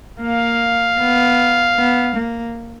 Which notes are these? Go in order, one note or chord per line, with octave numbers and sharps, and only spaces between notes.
A#3 F5
B3
B3
A#3